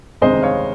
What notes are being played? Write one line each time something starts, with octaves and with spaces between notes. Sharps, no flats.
G1 F2 C3 D#3 G#3 C5 D#5
C#5 F5